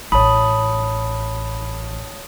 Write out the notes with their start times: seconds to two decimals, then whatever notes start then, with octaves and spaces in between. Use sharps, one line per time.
0.12 A1 C#5 A5 B5 D#6